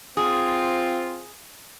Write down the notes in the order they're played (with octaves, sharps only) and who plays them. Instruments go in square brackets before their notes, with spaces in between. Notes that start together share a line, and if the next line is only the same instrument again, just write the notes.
[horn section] C4 F4 [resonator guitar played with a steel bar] G#4